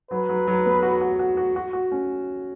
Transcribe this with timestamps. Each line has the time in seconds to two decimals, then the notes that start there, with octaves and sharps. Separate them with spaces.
0.11 F#3 B4
0.29 F#3
0.47 F#3
0.66 B3
0.83 F#4
1.01 F#4
1.19 F#4
1.37 F#4
1.56 F#4
1.73 F#4
1.92 C#4